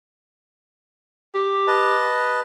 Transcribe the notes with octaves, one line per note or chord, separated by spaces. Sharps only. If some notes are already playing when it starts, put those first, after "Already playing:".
G4
B4 D#5 A5